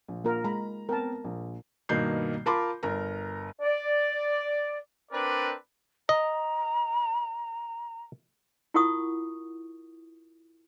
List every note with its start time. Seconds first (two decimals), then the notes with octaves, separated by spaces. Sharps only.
0.08 A#1
0.24 A#3 F4 A#4
0.44 G#3 A#5 B5
0.89 B3 C4 A#4 A5
1.24 A#1
1.89 G2 B2 D#3 A#3 G6 C7
2.46 F4 A#4 A5 B5 C6 D6
2.83 G1 A#4 A#5
3.61 D5
5.12 C4 D4 A#4 B4 D5
6.09 D#5 A#5
8.74 E4 F4 A#4 F#5 C#6 D#6